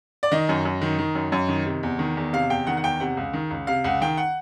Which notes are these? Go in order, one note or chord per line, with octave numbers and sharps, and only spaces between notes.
D5
D#3 D#5
F#2
F#2
D#3
D#3
F#2
F#2
D#3
C3
E2
D#3
E2
C3 F5
E2 G5
D#3 F#5
F#5
E2 G5
C3 F#5
C#2
D#3
C#2
C3 F5
C#2 F#5
D#3 G5
F#5